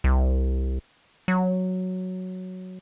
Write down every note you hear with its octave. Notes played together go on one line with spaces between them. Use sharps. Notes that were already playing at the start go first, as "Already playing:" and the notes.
C2
F#3